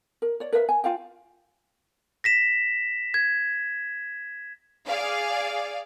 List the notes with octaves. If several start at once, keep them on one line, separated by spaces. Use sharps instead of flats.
A#4
C#5 D5
A#4 B4 E5 F5
G#5
F4 F5 G5
A#6 B6 E7
G#6
G#4 D5 F5